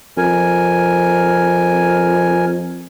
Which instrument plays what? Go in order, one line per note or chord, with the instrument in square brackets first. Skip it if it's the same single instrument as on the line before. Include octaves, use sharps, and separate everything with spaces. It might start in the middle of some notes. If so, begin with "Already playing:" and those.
[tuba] F2 [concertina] A#4 G#5